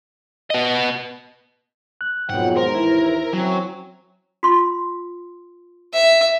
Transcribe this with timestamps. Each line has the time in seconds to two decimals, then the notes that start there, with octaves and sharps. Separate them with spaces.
0.50 B3 D#5
2.01 F#6
2.29 F2 G#2 B2 F#3 F#5 G5
2.57 D#2 A#4 C5
2.74 D#2 E3 E4
3.33 F#3 C4 C#4
4.43 F4 C6
5.94 E5